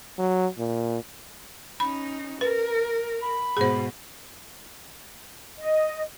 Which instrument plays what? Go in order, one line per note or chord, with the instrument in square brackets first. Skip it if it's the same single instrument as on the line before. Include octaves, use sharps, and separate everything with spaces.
[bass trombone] F#3
A#2
[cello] C#4 D#4 [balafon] B5
[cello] A#4 [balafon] B4
[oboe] B5
[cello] G#2 B2 [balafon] G#4 C5
[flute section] D#5